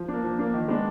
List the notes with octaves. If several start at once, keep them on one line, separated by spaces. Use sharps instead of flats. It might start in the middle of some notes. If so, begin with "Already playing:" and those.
Already playing: F3
A#3 D4
F3
A#3 D4
D#3
G#3 B3 D4